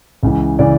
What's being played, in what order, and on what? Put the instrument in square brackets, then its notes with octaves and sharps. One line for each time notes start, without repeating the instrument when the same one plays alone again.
[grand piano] C#2 C#3 E3
C#3 E3 D5